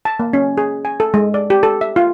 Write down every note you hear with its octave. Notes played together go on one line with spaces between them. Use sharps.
A5
A#3
C#4
G#4
G#5
A4
G#3
D5
G4
A4
E5
F4